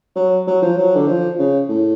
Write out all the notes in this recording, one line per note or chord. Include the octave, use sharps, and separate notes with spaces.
F#3
F#3
F3
F#3
D3
F3
C#3
A2